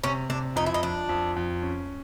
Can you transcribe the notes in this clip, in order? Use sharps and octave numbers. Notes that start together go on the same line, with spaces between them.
C3 C#4
C3 D4
F2 D#4
E4
D#4
F3 D4
F2
F2
C#4